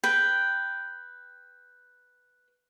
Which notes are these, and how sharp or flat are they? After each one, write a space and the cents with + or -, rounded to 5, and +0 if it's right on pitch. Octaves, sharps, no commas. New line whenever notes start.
B4 +0 G5 +0